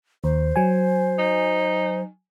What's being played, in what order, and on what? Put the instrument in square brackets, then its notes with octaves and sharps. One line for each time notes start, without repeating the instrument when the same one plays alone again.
[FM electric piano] D#2 [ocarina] C5
[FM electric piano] F#3 G#5
[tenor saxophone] D#4